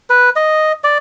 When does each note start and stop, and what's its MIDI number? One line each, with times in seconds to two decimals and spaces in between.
0.10 0.30 71
0.36 0.72 75
0.84 0.98 74